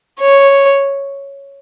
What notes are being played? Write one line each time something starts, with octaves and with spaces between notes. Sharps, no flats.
C#5